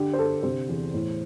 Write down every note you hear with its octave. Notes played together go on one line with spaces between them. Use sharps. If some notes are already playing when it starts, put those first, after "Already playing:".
Already playing: D3 G4
C5
D3 A4
C3 C5
E2
A2